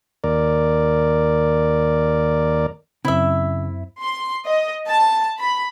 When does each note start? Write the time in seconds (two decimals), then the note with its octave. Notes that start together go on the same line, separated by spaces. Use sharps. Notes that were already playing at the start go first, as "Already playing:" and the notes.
0.24 D#2 A#4 D5
3.05 F#2 C#3 C4 E4 E5
4.01 C6
4.46 D#5
4.88 A5
5.39 B5